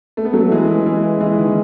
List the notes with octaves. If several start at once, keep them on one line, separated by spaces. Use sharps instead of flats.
A3
B3
F#3 A3
E3 G#3
E3 G#3
E3 G#3
D#3
E3